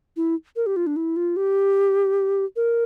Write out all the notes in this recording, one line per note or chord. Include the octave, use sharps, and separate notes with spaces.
E4
A#4
G4
F4
D4
E4
F4
G4
A#4